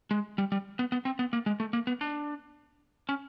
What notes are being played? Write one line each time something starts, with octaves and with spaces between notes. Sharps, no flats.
G#3
G3
G3
B3
B3
C4
B3
A#3
G#3
A3
A#3
B3
D4
C#4